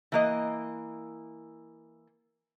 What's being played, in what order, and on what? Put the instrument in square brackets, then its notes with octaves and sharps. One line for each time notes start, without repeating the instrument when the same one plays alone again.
[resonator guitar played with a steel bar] E3 A#3 D#5